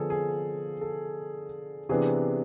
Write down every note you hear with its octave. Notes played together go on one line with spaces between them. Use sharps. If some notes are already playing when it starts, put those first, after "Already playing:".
Already playing: D3 F3 B3 D4 G#4 A4
G#4
A4
C3 E3 B3 D4 G#4